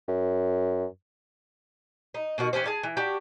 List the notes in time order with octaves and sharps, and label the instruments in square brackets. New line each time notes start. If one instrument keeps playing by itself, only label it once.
[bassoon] F#2
[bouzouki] D#4
B2 D#3 F#4
E3 C#4 G4 C5
G#4 G#5 A5
E3
D4 F#4 G4